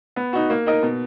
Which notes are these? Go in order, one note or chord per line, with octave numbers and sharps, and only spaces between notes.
B3
D#4 F#4
A#3
D#4 A#4 D#5
B2